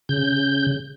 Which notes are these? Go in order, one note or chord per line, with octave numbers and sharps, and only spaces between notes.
C#3 G6